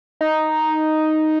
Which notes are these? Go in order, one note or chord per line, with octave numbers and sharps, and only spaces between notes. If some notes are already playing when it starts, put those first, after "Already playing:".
D#4